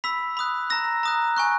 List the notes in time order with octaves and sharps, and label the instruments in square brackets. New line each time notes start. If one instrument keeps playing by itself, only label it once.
[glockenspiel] B5 E6 B6
B5 D#6 F#6
A#5 E6 A#6
A#5 D#6 F#6
G#5 C#6 F#6